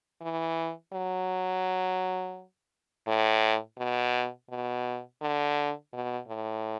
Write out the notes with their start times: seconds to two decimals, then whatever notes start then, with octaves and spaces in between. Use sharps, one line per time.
0.21 E3
0.93 F#3
3.07 A2
3.78 B2
4.50 B2
5.22 D3
5.93 B2
6.28 A2